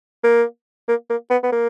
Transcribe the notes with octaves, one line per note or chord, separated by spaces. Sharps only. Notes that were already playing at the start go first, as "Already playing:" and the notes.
A#3
A#3
A#3
B3
B3
A#3